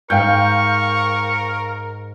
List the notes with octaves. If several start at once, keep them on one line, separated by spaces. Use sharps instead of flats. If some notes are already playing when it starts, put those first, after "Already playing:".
G#2 A#4 F5 G5 C#6 G6